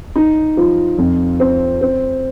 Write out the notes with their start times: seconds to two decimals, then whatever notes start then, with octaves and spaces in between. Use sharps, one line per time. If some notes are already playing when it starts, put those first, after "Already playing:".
0.16 D#4
0.57 F3
0.98 F2
1.40 C4
1.81 C4